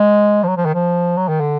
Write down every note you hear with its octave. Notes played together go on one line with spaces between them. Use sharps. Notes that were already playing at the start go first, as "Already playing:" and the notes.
Already playing: G#3
F3
F#3
F3
D#3
F3
F#3
D#3
D3